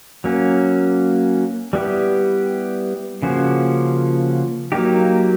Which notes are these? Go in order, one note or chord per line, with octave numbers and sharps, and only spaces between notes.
F#3 A#3 C#4
G3 B3 E4 G4
C#3 F3 A#3 C#4 F#4
F#3 A#3 D#4 G4